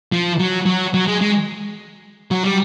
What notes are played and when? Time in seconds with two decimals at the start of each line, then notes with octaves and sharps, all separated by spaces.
0.12 F3
0.39 F#3
0.66 F#3
0.94 F#3
1.07 G#3
1.21 G#3
2.31 F#3
2.44 G3